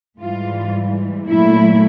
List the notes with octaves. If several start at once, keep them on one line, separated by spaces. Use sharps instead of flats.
G#2 E3 G3 F4
A#2 F#3 A3 E4